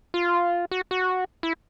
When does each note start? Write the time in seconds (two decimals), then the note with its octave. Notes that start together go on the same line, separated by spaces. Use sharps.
0.14 F4
0.71 F#4
0.91 F#4
1.43 E4